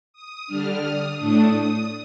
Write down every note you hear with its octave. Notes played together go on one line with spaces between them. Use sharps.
D#6
D3 G3 D4 F6
D#6
A2 A3 D4 D#6
D#6